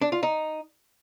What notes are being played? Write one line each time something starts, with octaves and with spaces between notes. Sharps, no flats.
D4
F4
D#4